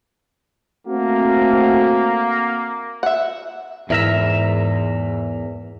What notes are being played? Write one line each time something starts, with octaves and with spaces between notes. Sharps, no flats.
A3 A#3 C4 F#4
E5 F#5
E2 G#2 E4 A#4 E5